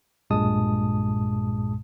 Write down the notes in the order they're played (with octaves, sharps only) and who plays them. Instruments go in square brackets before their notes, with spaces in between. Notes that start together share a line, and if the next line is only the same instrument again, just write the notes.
[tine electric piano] B1 G2 A#2 G#3 A5 D#6